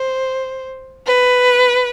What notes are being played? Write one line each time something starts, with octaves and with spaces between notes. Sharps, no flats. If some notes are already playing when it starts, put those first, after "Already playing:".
Already playing: C5
B4